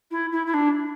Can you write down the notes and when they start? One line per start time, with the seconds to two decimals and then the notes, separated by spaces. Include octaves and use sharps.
0.11 E4
0.32 E4
0.46 E4
0.53 D4